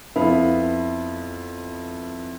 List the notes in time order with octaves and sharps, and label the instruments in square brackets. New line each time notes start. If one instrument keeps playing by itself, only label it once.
[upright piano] F2 B3 E4 F5 B5